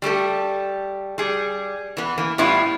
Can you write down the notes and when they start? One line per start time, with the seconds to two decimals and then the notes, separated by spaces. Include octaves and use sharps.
0.02 G3 A3 G4 A4
1.18 G3 G#4
1.97 E3 B3
2.18 E3 A#3
2.38 A2 G3 B3 E4 F4